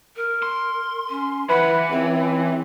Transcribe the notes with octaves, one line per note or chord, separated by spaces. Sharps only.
A#4
C6
C#4
E3 B4 F#5
C#2 C4